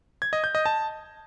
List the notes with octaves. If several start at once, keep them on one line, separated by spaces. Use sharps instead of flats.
G#6
D#5
G6
D#5
A5